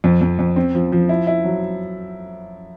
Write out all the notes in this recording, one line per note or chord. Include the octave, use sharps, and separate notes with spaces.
F2
F2
F2
C4
F3
F3
E4
E4
F#3